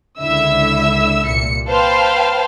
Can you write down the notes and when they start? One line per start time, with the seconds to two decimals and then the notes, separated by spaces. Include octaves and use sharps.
0.20 C#2 D3 E4 E5 E6
1.26 C2 A#2 C#7
1.69 B4 C5 F5 G5 A5